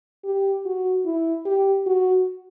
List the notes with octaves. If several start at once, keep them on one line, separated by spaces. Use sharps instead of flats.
G4
F#4
E4
G4
F#4